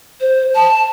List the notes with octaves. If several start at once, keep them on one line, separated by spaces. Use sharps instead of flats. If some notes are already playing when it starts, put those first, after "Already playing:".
C5
A5